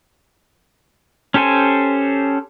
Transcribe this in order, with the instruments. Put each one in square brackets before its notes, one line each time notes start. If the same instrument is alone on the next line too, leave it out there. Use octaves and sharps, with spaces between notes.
[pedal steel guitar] C#4 G4 A4 C5 G#5